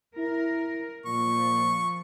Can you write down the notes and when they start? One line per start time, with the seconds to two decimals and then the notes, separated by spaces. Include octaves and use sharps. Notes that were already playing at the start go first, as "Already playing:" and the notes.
0.17 E4 A#4
1.06 A#2 F3 C#6